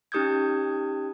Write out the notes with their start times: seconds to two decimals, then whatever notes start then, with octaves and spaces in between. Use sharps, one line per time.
0.12 C#4 D#4 G4 D#6 G6 G#6